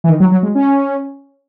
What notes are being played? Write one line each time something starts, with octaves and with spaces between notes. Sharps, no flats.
E3
D#3
F#3
F#3
G#3
C#4